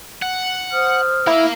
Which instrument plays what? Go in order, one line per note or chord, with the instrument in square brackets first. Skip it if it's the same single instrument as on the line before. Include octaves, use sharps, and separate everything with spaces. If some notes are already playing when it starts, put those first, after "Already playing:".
[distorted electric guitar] F#5
[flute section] C5 D#6 F6
[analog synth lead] E4 [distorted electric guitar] A#4 F5